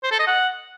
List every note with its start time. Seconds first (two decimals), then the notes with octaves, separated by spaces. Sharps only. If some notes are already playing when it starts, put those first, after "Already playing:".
0.03 C5
0.11 A4
0.19 D#5
0.27 F#5